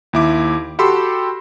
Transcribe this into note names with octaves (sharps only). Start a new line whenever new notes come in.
D#2 E4 D6
F#4 G4 A4 B5 C6 E6